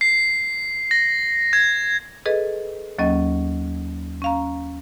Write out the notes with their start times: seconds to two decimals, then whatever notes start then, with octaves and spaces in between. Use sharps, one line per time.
0.01 C7
0.91 A#6
1.53 G#6
2.26 G#4 A4 B4 D#5
2.99 D#2 F#3 A#3 C#4 D#5
4.22 C#4 F5 A#5